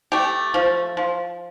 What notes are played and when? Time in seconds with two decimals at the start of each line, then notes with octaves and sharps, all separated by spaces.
0.12 A3 G4
0.54 F3
0.97 F3